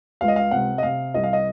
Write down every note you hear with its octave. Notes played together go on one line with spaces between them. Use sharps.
C#2 F5
D#5
F5
C3 F#5
D#5
C3 F5
C2 D#5
F5
D#5